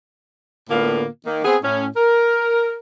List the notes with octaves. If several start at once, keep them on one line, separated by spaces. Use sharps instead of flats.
A2 D3 A#3 B3 F4
D#3 A#3
B3 C4 G#4
A2 C#4
A#4